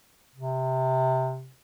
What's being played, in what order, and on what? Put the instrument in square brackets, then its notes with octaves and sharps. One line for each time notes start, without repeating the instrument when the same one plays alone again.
[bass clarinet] C3